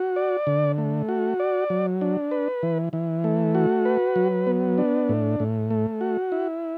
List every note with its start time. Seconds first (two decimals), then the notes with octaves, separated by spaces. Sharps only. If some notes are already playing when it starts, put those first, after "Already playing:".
Already playing: F#4
0.16 D5
0.47 D3
0.78 A3
1.09 F#4
1.40 D5
1.70 F#3
2.01 D4
2.31 B4
2.63 E3
2.93 E3
3.24 A3
3.55 F#4
3.85 B4
4.16 F#3
4.47 B3
4.78 D4
5.09 A2
5.40 A2
5.71 A3
6.01 F#4
6.32 E4